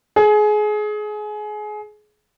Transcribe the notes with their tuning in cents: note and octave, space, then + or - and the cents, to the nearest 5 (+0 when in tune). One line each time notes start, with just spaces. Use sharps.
G#4 +25